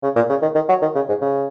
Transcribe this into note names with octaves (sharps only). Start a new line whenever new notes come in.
C#3
A#2
C#3
D#3
D#3
F#3
D#3
C#3
G#2
C#3